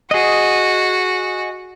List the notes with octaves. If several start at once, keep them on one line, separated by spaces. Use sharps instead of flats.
F#4 G#4 D#5